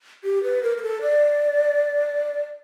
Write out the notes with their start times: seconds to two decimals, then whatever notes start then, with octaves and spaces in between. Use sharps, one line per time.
0.24 G4
0.43 B4
0.63 A#4
0.78 A#4
0.82 A4
1.02 D5